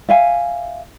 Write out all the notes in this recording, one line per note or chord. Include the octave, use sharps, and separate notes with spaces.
E5 F5 G#5